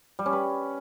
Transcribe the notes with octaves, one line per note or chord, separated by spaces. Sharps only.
G3
C#4
B4